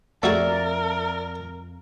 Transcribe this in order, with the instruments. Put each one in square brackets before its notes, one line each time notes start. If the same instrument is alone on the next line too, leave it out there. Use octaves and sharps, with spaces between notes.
[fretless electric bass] F2 [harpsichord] A3 F#4 G#4 [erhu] A#4 [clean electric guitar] D5 E5